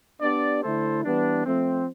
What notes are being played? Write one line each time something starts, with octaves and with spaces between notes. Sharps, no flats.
B3 D4 G4 D5
D3 A3 E4 A4 C5
E3 G3 B3 D4
F3 A3 C4